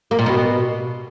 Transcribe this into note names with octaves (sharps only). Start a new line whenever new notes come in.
A#3
A#2
B2